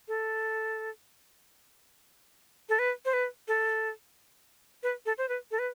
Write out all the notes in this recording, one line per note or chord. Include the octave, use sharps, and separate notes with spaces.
A4
A4
B4
C5
B4
A4
B4
A4
C5
B4
A4
B4